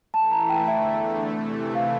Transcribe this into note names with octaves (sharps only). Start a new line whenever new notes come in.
E3 A3 E4 A5
A#5
G5
E2 D3 A3 E5
C3 E3 A3
F5